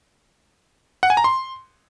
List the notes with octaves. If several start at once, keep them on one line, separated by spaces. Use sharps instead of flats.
F#5
G#5
A#5
C6